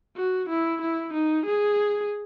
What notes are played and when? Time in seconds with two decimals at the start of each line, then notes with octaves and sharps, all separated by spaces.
0.16 F#4
0.49 E4
0.82 E4
1.14 D#4
1.46 G#4